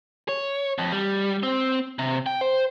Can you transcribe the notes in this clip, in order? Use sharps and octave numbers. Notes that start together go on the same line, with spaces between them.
C#5
F2
G3
C4
C3
G5
C5